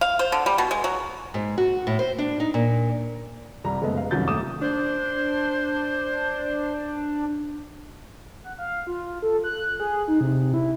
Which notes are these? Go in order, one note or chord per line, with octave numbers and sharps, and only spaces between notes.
F5
C5
D3
G3
B2
G#3
F#3
G#2
F#4
A2
C5
D4
D#4
A#2
C2 G3 A#5
F#1 G#3 A3 B3 A4 D#5
F5
C2 F#2 D#3 F#4 G6 A6
D#2 A3 D6 D#6 E7
D4 C5
F#5
F5
F4
A4
F#6
G#4
D#4
C3
E4